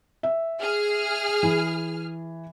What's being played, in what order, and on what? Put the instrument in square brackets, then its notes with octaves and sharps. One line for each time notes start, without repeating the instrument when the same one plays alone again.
[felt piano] E5
[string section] G#4 F6
[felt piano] E3